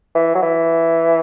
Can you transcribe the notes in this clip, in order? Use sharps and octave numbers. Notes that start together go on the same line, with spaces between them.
E3
F#3
E3